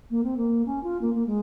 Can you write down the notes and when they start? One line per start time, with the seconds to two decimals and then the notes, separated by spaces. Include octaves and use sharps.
0.10 A#3
0.23 C4
0.37 A#3
0.65 C#4
0.83 F4
1.01 A#3
1.14 A#3
1.26 G#3